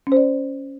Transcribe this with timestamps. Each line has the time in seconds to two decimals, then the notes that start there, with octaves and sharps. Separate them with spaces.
0.07 C#4
0.12 C5
0.17 D5